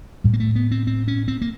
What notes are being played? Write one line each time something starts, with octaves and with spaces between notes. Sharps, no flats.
A2 G3
A#3
A3
B3
C4
C4
C#4
C4
A#3